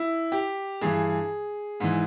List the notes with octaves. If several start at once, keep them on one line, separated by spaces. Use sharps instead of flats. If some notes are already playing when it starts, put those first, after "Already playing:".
Already playing: E4
G4
G2 E3 G#4
G#2 E3